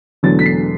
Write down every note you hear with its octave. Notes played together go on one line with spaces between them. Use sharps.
E1 E2 D3 F#3 A3 A6
B6
C7